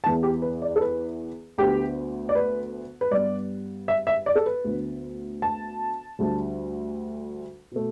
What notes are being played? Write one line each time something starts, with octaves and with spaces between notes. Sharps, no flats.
E2 E3 B3 A5
G4
B4
D5
A4
B4
D2 D3 B3 G4
D5
B4
B4
G2 G3 B3 D5
E5
E5
D5
A4
B4
D2 D3 B3
A5
D2 D3 G3
B2 A3